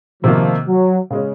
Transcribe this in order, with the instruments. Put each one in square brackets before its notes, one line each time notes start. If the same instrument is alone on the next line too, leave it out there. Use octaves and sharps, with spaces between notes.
[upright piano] C3 D#3 A#3 [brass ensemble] F3
[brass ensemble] F#3
[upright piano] C#3 G#3 C#4